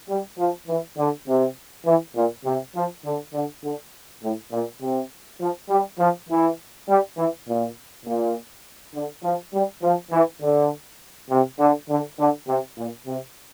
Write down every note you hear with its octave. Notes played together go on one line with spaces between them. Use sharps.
G3
F3
E3
D3
C3
E3
A#2
C3
F3
D3
D3
D3
A2
A#2
C3
F3
G3
F3
E3
G3
E3
A#2
A#2
D3
F3
G3
F3
E3
D3
C3
D3
D3
D3
C3
A#2
C3